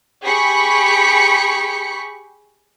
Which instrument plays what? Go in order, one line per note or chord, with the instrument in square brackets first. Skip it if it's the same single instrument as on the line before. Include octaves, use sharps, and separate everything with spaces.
[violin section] G4 G#4 B5 C#6 B6 C#7